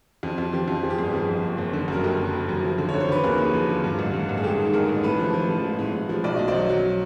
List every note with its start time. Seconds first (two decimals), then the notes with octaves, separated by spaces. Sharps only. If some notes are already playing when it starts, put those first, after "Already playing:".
0.23 F2
0.38 F2
0.53 F3 G4
0.68 F2
0.83 F3 G#4
0.90 G4
0.98 G1 G#4
1.14 F3
1.29 F2
1.43 F#1
1.58 F#1
1.73 D3
1.88 F#2 A#4
2.04 F#1 G4 A4
2.18 F#2
2.33 F#1
2.49 F#2
2.63 F3
2.78 D3
2.89 C#5
2.94 D3
3.00 C5
3.09 D3 B4
3.24 D#2 G#4 A#4
3.38 D#2
3.53 F3
3.69 D3
3.84 G2
3.99 A1
4.14 G2
4.29 A1
4.37 G#4
4.43 G#3 G4 A4
4.59 D#3
4.73 A1 G#4 A#4
4.89 A1
5.03 A2 A4 B4
5.19 F3
5.34 F3
5.49 F3
5.64 G#3
5.79 A2
5.94 A2
6.09 F3
6.24 B1 D5
6.36 B1 D#5
6.48 C5 D5
6.54 F#3
6.69 F#3